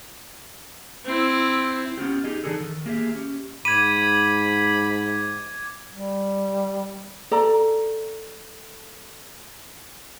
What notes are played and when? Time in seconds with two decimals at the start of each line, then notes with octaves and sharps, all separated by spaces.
1.05 C4 E4
1.97 B3 C#4 F4 G4
2.24 D#4 G4 G#4 D#5
2.44 E3 G3 D4 D#4 G#4 A4
2.60 D#3
2.86 A#3 G4 G#4 D#5 E5
3.15 C#4 G4
3.65 G#2 B5 D6 G#6 D#7
5.91 G3
7.31 A4 D5 A#5